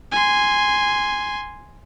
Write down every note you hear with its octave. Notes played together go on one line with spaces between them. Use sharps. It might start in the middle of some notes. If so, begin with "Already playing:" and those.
G#5 C6